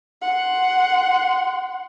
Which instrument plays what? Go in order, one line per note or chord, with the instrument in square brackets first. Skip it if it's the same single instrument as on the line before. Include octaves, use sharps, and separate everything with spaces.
[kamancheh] F#5 C6